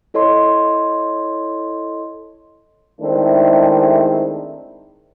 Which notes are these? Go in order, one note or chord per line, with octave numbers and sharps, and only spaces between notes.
E4 A4 C#5 D#5 C6
D#3 G#3 A3 C4 D4 E4